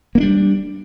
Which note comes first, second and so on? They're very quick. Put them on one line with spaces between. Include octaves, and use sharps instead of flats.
A#3 C#4 D4 G3